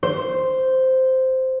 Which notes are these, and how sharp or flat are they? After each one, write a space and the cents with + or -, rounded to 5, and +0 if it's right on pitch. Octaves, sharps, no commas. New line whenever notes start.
C5 -5